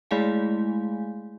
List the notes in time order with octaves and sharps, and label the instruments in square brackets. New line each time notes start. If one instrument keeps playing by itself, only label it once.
[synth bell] G#3 A3 E4 G#4 F5 G#5